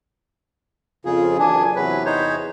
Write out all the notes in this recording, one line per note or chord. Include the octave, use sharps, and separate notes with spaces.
F2 C#3 F4 G#4
F#1 E3 D4 G#5
E2 C3 F#3 B4
D#4 C5 C#5